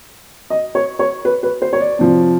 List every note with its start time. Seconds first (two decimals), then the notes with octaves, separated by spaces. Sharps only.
0.50 D#5
0.75 C#5
0.99 C#5
1.25 B4
1.43 B4
1.62 C5
1.73 C#5
1.80 D5
1.99 C3 F3